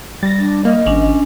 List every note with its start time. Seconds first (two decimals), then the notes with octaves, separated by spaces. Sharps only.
0.23 G3 A6 A#6
0.39 D4
0.65 A#3 D#5
0.86 G#1 C#4 D4 G#5